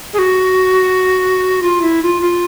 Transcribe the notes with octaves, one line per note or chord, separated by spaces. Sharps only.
G#4
F#4
F4
E4
F4
F4